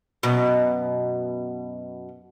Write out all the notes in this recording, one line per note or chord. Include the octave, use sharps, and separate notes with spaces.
F#2 B2